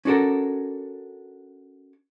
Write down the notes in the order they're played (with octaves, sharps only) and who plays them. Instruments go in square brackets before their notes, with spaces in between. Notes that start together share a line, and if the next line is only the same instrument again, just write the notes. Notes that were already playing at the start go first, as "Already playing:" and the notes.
[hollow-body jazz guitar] C#4 D4 F#4 A4 A#4